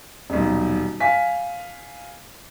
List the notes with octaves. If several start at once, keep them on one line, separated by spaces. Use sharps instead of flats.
D#1 B1
F5 G#5 B6